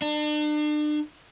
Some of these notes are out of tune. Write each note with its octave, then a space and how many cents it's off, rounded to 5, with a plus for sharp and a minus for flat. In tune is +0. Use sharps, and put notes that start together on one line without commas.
D4 +40